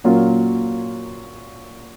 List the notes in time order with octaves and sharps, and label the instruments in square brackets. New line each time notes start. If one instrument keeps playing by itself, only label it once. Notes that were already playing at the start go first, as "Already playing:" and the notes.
[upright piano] A#2 F#3 A#3 C#4 F4